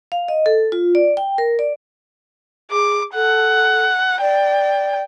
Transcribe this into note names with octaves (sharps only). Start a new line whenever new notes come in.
F5
D#5
A4
F4
D5
G5
A#4
D5
G#4 D6
A4 F#5
D5 G5